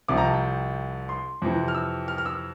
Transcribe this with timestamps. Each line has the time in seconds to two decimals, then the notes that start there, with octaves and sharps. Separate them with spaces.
0.08 C2 C3 F3 D6
0.17 A#5
0.25 A5
0.34 G5
1.09 C6
1.42 F2 C3 E3
1.68 F6
1.75 E6
2.08 F6
2.18 F6
2.26 E6